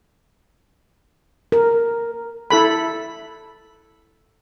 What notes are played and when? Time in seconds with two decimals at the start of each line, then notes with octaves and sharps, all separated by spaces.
1.52 A#4
2.50 E4 A4 B5